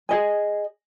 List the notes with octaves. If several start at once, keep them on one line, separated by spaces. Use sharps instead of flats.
G#4 D#5 G#5